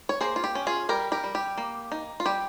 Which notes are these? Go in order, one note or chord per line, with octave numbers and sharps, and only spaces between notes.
C#5
A#3 G#4 C5
F4
G4
C#4
F4 G#4
G3 G4 A#4
G4 A#4
G3
G4
A#3
D#4
F4
G3 G4